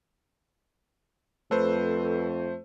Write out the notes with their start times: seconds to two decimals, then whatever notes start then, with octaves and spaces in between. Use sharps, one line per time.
1.51 F2 A3 A4 B4 C5